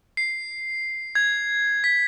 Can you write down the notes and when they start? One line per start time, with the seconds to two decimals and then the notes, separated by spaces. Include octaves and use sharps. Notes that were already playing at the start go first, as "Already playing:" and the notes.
0.17 C7
1.15 G#6
1.84 B6